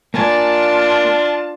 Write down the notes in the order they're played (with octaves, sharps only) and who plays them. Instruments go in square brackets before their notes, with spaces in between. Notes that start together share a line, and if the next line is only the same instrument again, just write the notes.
[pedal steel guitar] A#3 G#5 [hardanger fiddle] D4 [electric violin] F4 A5